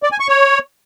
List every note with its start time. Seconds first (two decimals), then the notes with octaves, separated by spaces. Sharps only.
0.03 D5
0.12 G#5
0.20 C#6
0.29 C#5